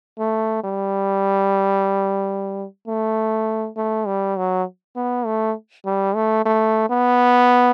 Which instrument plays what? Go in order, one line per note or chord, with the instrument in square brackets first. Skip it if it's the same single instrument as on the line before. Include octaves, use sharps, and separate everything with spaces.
[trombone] A3
G3
A3
A3
G3
F#3
B3
A3
G3
A3
A3
B3